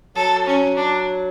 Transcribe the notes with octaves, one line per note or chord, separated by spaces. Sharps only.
F#3 A4
C#4
D4